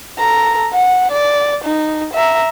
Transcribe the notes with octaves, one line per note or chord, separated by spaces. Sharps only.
A4 A#5
F#5
D5
D#4
E5 A#5